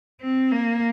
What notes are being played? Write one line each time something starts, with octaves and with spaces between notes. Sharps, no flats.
C4
A#3